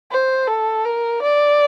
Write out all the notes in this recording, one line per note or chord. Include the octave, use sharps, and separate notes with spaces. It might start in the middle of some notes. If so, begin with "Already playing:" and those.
C5
A4
A#4
D5